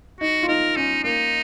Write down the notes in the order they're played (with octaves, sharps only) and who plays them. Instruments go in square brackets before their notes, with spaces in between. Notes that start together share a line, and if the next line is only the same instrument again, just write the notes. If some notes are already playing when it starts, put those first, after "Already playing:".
[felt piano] D#4 [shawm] F#4
[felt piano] F4
[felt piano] D#4 [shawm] A#4
[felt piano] C#4 [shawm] D#4
[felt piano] A#3 [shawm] D#4